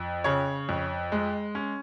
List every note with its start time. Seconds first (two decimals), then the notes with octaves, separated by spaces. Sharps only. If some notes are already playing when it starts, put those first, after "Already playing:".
Already playing: F2
0.24 C#3 C#5
0.69 F2
1.12 G#3
1.55 C#4